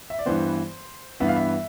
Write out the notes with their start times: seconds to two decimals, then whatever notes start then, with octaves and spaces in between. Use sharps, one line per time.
0.10 E5
0.19 D5
0.26 G2 E3 B3 C5
1.20 G2 E3 B3 E5
1.28 F5
1.36 E5